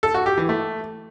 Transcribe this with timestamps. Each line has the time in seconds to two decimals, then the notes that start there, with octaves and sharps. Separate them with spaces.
0.03 A4
0.14 F#4
0.26 G4
0.37 E3
0.49 A3